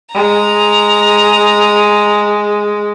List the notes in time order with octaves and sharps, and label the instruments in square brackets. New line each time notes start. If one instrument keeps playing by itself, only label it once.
[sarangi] G#3 [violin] A#5